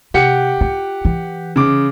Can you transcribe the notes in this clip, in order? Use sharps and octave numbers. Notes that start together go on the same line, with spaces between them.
C3 G4 F#5 C#7
F4
E3
C#3 D6